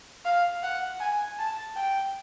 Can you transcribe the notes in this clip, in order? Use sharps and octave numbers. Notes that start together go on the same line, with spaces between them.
F5
F#5
G#5
A5
G5